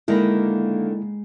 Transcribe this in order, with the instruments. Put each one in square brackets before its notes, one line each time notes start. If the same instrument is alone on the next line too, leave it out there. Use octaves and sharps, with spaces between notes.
[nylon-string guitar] D3 D#3 [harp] G#3 A#5 B5 [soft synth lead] A#3 [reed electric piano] E4